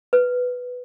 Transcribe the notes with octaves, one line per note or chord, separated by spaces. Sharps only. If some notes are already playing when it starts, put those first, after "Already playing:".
B4